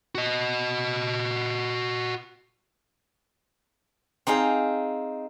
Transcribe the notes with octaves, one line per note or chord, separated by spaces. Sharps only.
F#4 D#5
C4 D#4 G#4 F5